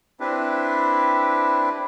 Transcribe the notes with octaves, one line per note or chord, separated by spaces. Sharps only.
C4 D4 E4 G4 B4